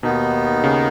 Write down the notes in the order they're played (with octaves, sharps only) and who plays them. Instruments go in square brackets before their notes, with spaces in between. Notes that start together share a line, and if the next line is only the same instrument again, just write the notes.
[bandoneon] D#2 D#3 B3 D#4 [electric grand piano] B2
[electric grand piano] C#3